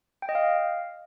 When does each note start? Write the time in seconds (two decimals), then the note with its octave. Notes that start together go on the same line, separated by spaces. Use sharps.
0.22 G5
0.29 D#5
0.35 F5